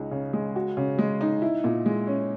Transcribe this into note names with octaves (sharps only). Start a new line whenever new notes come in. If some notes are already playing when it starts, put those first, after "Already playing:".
Already playing: C#2 D#4
C#3
G#3
F#4
C#3
G#3
D#4
E4
A#2
G#3
C#4